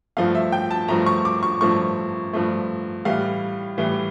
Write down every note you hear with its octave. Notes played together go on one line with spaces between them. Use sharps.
G2 F3 A3 F5
E5
G5
A5
G2 F3 A3 A#5
C#6
D6
C#6
G2 F3 A3 C#6
G2 F3 A3
A2 E3 G3 F5
A2 E3 G3